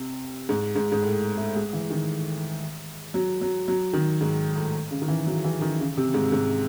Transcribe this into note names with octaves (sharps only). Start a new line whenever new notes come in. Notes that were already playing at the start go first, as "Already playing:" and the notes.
Already playing: C3
G#2
G#2
G#2
A2
A3
G#3
E3
D#3
F#3
F#3
F#3
D#3
G#2
A2
C#3
D#3
E3
F#3
E3
D#3
C#3
C3
G#2
G#2